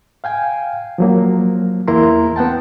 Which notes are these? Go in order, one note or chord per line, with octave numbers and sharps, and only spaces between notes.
F5 G5 G#5
F3 F#3 A#3
E2 A#3 E4 A#4 A#5 C6
B3 F#5 G5 A5